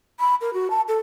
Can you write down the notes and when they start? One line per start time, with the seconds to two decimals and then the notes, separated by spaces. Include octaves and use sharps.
0.20 B5
0.41 A#4
0.54 F#4
0.70 A5
0.88 A4